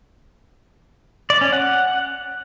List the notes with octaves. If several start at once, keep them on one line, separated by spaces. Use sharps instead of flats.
D5
C#4
F#5